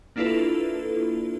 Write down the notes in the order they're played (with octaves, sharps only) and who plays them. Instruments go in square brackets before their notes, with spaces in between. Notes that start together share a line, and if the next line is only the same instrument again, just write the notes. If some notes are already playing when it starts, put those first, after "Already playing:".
[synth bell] A#3 D4 E4 F4 A4 B4